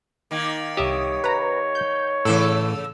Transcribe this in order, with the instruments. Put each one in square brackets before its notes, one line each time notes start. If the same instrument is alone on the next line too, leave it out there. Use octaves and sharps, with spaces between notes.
[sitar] D#3 A#3
[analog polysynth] C2 D#6 [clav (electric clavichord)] G4 E5 [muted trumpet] C#5
[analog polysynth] B4 A#5
G6
[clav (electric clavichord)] A2 E3 [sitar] C#3 A4 [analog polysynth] E6